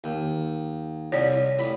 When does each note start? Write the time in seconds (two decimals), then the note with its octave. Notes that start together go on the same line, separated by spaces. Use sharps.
0.04 D#2
1.12 C2 C#5 D5
1.59 A1 B5